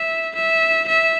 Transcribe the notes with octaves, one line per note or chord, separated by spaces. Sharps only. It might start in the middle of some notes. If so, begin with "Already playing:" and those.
Already playing: E5
E5
E5